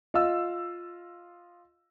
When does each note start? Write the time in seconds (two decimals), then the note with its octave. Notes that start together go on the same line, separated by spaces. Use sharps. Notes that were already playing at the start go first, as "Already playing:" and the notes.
0.14 F4 D#5 F5 E6